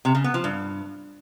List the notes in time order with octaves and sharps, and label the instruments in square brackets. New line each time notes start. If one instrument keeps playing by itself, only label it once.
[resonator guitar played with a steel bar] C3
C#3
B3
F3
G2